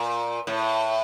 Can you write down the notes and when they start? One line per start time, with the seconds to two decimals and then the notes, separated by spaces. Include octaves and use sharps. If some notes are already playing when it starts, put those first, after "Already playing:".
Already playing: A#2
0.47 A2